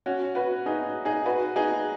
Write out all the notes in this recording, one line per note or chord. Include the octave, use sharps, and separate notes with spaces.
C#4 F#4
F#4 B4
D#4 G#4
D#4 G#4
F#4 B4
D#4 G#4